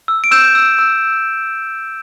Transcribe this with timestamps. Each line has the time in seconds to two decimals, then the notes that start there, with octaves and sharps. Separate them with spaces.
0.08 E6
0.24 D7
0.31 E6 G6 E7
0.55 E6
0.79 E6